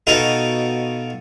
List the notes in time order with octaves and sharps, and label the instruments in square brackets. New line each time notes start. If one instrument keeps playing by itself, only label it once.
[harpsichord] B2 D#4 F4 A4